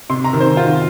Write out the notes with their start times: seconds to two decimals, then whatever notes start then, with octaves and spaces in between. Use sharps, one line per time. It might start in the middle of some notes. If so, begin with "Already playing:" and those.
0.10 C3 C6
0.24 A#5
0.33 D#3
0.40 C5
0.57 D#3 F4